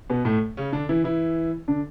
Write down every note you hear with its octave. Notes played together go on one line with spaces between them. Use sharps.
B2 B3
A2 A3
C#3 C#4
D3 D4
E3 E4
E3 E4
D3 D4